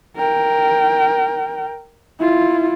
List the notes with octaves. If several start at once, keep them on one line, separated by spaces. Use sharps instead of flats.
A#4 G5
E4 F4